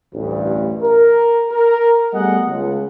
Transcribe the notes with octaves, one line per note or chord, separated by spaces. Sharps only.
A1 D2 G2
A#4
A#4
G3 A3 B3 G#4 D#5 F#5
C#2